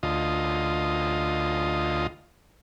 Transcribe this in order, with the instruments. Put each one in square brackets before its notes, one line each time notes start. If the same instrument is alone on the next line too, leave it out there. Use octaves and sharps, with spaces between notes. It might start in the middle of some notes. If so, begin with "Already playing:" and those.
[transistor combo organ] D2 F4 D#5